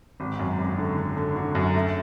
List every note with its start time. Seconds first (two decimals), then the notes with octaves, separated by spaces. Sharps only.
0.20 G#1
0.39 F#2
0.59 G#1
0.78 D3
0.97 D3
1.17 D3
1.36 D3
1.55 F#2
1.74 A3